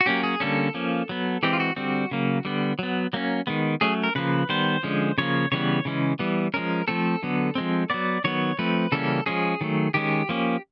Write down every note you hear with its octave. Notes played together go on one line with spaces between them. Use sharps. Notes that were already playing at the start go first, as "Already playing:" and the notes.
F#4
F#3 A#3 C#4 G4
G#4
D3 G3 A#3 C#4 A4
F3 A#3 C#4
F#3 B3
E3 G#3 C4 G4
F4
F#4
D3 G3 C4 F#4
C#3 F#3 A#3
D3 G3 B3
F#3 B3
F#3 A#3 C#4
D#3 G#3 B3
F#3 A3 C#4 G#4
A#4
C#3 F3 A#3 B4
D#3 G3 B3 C5
D3 F3 G#3 C#4
C#3 F3 A#3 C#5
C#3 E3 G3 B3 C#5
C#3 E3 G#3 C#4
E3 G3 B3
F3 G#3 C#4 A#4
F3 A3 C4 A4
D3 F#3 B3
F3 G#3 C4
F#3 B3 D5
D#3 F#3 B3 C#5
F3 A3 C4 B4
C#3 E3 G3 A#3 C#4 A4
F3 G#3 C#4 G#4
D#3 F#3 A3
D#3 G#3 C#4 G4
F3 A#3 C#4